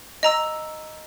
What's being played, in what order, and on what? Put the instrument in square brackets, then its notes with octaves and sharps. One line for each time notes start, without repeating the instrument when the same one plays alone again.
[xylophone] D#5 A#5 E6